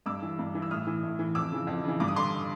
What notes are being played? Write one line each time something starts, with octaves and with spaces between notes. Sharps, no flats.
G2 D6 E6
E3
G2
E3
E6
A2 D#6 F6
E3
A2
E3
F2 D6 E6
C#3 E3
F2
C#3 E3
G2 D6
D#6
D3 C6 D6